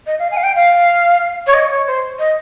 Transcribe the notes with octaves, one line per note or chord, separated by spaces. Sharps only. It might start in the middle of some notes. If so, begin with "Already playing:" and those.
D#5
F5
G#5
F5
G5
F5
C#5
D#5
C#5
C5
D#5